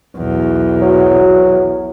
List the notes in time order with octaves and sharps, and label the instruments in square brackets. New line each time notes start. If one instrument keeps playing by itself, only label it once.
[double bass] B1 E2
[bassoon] F#3